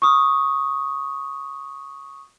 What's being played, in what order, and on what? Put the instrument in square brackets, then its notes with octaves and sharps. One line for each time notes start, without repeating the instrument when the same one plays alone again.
[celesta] C#6 D#6